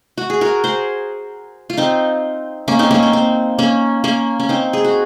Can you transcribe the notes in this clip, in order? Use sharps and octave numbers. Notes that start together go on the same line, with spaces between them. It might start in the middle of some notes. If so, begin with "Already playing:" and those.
F#4
G#4
F#4 A#4
G#4 C5
F4
C4 D#4
A#3 C#4
C4 D#4
A#3 C#4
C4
C4
A#3 C#4
A#3 C#4
C#4
C4 D#4
G#4
F#4